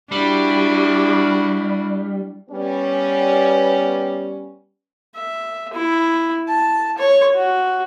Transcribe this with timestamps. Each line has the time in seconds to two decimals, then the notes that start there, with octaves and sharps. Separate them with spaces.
0.12 G3 D4 E4 F#4
2.49 G3 B3 C#4
5.15 E5
5.74 E4
6.48 A5
6.98 C#5
7.35 F#4